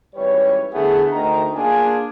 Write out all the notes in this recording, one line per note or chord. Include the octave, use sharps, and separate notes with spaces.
G#1 E3 G3 B4 C#5
D3 A3 B3 E4 G#4
D2 D#3 D#5 A#5
A#3 D4 F4 G#4 F5 G#5